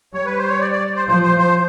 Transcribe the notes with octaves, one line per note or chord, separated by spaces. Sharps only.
G3 C#5
B4
C5
C#5
D5
D5
C5
F3 C5
C5
C5